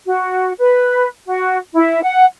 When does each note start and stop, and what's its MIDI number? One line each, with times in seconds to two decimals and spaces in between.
0.06 0.52 66
0.59 1.08 71
1.27 1.58 66
1.74 2.02 64
2.02 2.24 78